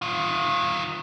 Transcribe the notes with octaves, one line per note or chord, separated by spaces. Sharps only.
D#3 F4